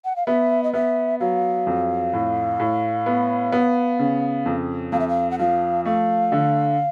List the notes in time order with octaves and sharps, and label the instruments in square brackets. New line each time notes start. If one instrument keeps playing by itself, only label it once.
[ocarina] F#5
F5
[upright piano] B3 [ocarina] E5
[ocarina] D#5
[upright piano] B3 [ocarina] E5
[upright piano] F#3 [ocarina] F5
[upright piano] F2
A2
A2
B3
B3
C#3
F2
[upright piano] F2 [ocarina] F5
[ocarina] E5
F5
F#5
[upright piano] F3 [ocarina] F5
[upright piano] A3 [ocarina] F5
[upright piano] D3